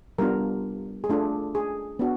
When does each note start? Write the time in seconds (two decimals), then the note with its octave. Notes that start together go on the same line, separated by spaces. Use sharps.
0.18 G3 B3 D4 F4 A#4
1.04 G#4
1.09 A3 D4 F4 A4
1.55 G#4
1.99 B3 D4 F#4